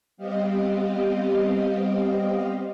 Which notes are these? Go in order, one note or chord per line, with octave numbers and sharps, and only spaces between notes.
G3 B3 C4 G4 D#5 F5